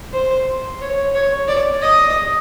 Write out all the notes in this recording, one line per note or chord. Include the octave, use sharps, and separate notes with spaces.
C5
C#5
C#5
D5
D#5